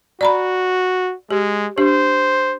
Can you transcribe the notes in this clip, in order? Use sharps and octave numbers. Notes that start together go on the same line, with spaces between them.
F#4 D5 A#5 B5
G#3 G4
D4 G4 C5